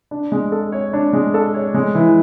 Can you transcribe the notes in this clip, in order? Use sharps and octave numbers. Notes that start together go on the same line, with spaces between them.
D4
G#3
A4
C#5
D4
G#3
A4
C#5
G#3
E3